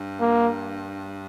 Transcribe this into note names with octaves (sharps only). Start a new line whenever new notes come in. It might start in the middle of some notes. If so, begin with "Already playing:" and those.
Already playing: G2
A#3